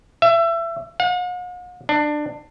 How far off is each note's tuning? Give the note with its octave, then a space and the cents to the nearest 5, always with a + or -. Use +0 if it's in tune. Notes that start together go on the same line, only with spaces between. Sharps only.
E5 +25
F#5 -45
D4 +20